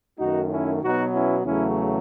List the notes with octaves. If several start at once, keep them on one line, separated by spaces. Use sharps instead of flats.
F#2 D#3 A3 D#4 F#4
C#4 E4
B2 F#3 B3 D#4 F#4
C#4 E4
E2 C#3 F#3 A3 C#4 E4